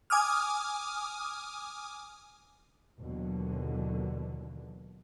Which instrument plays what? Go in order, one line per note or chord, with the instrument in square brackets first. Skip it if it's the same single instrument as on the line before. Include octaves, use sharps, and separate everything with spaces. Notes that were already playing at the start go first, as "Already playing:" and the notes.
[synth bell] G#5 D6 D#6 F6
[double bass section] D#2 B2 D3 E3 F#3